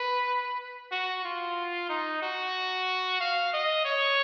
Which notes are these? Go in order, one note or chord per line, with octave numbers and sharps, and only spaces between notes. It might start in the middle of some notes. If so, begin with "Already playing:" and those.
Already playing: B4
F#4
F4
D#4
F#4
F5
D#5
C#5